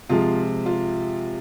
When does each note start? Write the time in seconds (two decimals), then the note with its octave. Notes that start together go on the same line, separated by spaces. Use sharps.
0.09 C3 F3 G#3 F4
0.66 F4